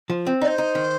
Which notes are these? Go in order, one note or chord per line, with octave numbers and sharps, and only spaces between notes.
F3
C4
D#4 D5
C5
D#4
D#3